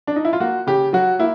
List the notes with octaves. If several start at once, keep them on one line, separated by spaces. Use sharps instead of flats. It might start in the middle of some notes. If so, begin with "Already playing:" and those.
D4
D#4
E4
F4
A#3 F#4
C#3 G4
F#3 F#4
A#3 E4